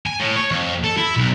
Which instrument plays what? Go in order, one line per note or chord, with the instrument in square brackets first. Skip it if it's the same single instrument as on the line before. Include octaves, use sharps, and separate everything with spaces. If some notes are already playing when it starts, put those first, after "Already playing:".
[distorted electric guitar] G#5
A2
C#5
F2
A4
E4
B1